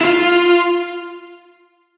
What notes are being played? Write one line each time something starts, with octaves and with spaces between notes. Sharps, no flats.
E4
F4